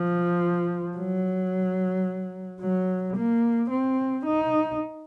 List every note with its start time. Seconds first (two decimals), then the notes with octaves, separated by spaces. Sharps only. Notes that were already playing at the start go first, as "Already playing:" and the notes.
Already playing: F3
0.97 F#3
2.61 F#3
3.16 A#3
3.71 C4
4.26 D#4